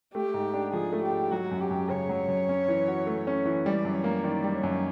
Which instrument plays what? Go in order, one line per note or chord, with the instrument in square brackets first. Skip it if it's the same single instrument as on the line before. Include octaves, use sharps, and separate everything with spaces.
[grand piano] A3 [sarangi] G4
[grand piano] G#2
D4
[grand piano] F3 [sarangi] G#4
[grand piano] A3
[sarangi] G4
[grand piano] G#2
[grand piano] F#3 [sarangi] F#4
[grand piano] F#2
[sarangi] G4
[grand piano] F#2
[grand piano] C#3 [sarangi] C#5
[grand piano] F#3
F#2
C#4
E3
F#4
A3
C#4
E3
[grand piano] G3 [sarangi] D5
[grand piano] F#2
[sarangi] C#5
[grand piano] A#3
[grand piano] D#3 [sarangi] D5
[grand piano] G3
[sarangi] C#5
[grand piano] F#2